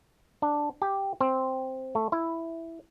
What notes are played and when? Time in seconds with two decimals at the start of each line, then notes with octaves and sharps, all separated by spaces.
0.42 D4
0.82 G4
1.21 C4
1.95 A3
2.12 E4